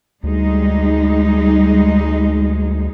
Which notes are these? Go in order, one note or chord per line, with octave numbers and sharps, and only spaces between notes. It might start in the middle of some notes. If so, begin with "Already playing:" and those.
D2 G3 G#3 D#4